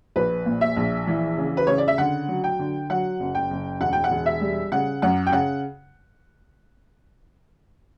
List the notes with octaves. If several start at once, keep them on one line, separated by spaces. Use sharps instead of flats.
A#1 B4
A#2
E5
A#1
E3
C#3
B4
C#3 C#5
D5
E5
D3 F#5
F#3
G5
D3
F#3 F#5
F#1
G5
F#1
E1 F#5
G5
F#5
E1
E5
G3
C#3 F#5
F#2 F#5
G5
C#3 F#5